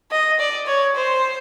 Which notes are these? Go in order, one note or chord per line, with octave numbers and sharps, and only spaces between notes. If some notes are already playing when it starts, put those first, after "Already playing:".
D#5
D5
C#5
C5